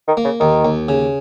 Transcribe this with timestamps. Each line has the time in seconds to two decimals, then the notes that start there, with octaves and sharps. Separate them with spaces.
0.08 D#3
0.17 A#3
0.25 C#3
0.40 D#2 D#3
0.65 D#2
0.89 C#3